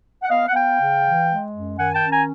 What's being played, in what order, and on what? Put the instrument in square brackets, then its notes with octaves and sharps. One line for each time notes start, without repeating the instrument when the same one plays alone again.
[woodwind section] F#5
B3 D#5 F5
F#5
B3 F5 G5
C#3
E3
G#3
F#2
D#3 F#5 G#5
G5 A5
C#4
G#5 A#5